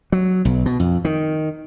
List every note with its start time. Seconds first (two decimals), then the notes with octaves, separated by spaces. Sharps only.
0.12 F#3
0.45 B1
0.66 B2
0.80 F2
1.05 D#3